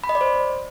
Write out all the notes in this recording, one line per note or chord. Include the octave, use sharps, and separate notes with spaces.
B5
D#5
D5
C5